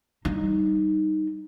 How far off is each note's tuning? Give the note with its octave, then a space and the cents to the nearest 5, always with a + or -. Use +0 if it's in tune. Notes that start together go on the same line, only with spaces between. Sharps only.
G3 -20 D#4 +0